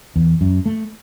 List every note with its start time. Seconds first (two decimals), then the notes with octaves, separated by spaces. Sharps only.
0.16 E2
0.41 F#2
0.66 A3